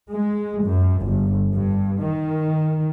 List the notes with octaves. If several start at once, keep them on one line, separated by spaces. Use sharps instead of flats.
G#3
F#2
G1
G2
D#3